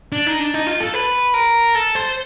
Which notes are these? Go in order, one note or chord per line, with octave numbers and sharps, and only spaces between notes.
D4
D#4
D4
D#4
F4
A4
B4
A#4
A4
C5